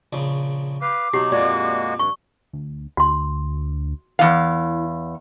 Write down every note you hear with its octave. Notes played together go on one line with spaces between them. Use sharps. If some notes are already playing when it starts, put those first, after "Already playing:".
A#1 C#3
B4 F5 D6
B2 F#3 D#4 G4
F2 A#2 G#3 A#3 F#4 D5 D#5
G2 C#6
D2
D2 F#4 C6
E2 E4 F5